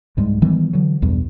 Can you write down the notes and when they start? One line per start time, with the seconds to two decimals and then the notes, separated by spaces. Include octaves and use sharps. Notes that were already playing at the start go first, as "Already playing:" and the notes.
0.17 C2 G#2 G3 G#3
0.42 D#3 E3 G3 B3
0.73 D3 E3 F#3
1.02 B1 E2 G2